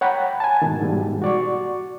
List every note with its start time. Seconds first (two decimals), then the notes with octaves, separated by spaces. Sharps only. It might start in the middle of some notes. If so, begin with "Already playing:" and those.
0.01 C#5 F#5 G5 A#5 B5
0.40 G#5 A5
0.62 G#2 B2 D#3
0.81 G#2 B2 E3 G3
1.22 F#4 D5 C#6